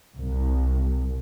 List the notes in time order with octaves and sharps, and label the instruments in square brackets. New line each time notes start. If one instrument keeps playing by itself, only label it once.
[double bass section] C2